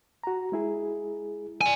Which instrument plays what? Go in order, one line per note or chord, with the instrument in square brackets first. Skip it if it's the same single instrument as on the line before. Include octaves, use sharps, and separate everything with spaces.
[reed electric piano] F#4 A#5
G#3 E4 G#4
[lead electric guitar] D5 G#5